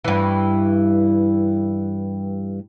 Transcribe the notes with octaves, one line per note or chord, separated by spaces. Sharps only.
G2 E3